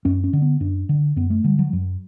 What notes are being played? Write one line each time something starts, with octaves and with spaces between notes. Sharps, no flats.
F#2 C#4
C#4
D3
B3
F#2 D4
D3
F#2 B3
A3
D3 G3
F#3
F#2 F#3